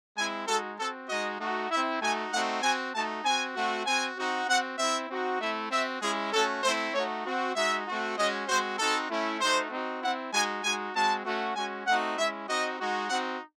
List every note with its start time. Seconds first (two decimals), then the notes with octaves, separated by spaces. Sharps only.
0.17 G#3 C4 E4 G#5
0.48 G#3 D#4 F#4 A4
0.78 C4 F#4 A4
1.09 G#3 D#4 F#4 D#5
1.40 A3 D#4 F#4
1.71 E4 E5
1.75 C4
2.02 A3 D#4 F#4 G#5
2.32 A3 C4 D#4 F#4 F#5
2.63 C4 F#4 G#5
2.94 A3 D#4 F#4 A5
3.25 C4 F#4 G#5
3.56 A3 C4 F#4
3.86 C4 F#4 G#5
4.17 C4 D#4 F#4
4.48 C4 F#4 F#5
4.79 C4 E4 E5
5.10 C4 D#4 F#4
5.40 A3 C4 E4 E5
5.71 C4 F#4 E5
6.02 G#3 C#4 E4 G#4
6.33 A3 C#4 F#4 A4
6.64 A3 C4 E4 C5
6.94 A3 D#4 F#4 C#5
7.25 C4 F#4
7.56 G#3 D#4 F#4 E5
7.87 A3 C4 F#4
8.18 G#3 C#4 F#4 D#5
8.48 G#3 C4 F#4 C5
8.79 C4 D#4 F#4 A4
9.10 A3 C#4 E4
9.41 A3 D#4 F#4 C5
9.71 C4 D#4 F#4
10.02 C4 E4 F#5
10.33 G#3 D#4 F#4 G#5
10.64 G#3 D#4 F#4 G#5
10.95 G#3 C4 F#4 A5
11.26 A3 C#4 F#4
11.56 G#3 C#4 F#4 G#5
11.87 A3 C4 D#4 F#4 F#5
12.18 G#3 C#4 E4 E5
12.49 C4 D#4 F#4 D#5
12.80 G#3 D#4 F#4
13.10 C4 D#4 F#4 F#5